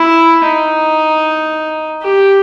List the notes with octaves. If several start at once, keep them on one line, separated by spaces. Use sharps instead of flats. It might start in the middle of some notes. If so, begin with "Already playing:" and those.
Already playing: E4
D#4
G4